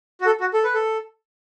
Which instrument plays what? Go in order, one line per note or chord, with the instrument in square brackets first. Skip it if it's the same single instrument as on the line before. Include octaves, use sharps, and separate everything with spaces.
[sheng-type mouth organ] F#4
A4
F#4
A4
B4
A4